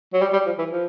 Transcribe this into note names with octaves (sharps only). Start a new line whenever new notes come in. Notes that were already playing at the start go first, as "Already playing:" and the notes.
F#3
G3
G3
F3
E3
F3